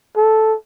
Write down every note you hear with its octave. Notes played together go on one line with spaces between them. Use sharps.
A4